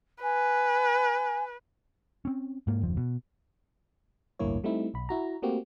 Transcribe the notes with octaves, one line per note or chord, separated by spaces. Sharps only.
B4 G#5
C4 C#4
G#2 A#3
F#1 D#2 F3
B2
A1 D2 G2 A#3 E4 C#5
G3 A3 C4 D#4 E4
B1 B5
E4 F#4 A#5
A3 A#3 C4 F#4 G4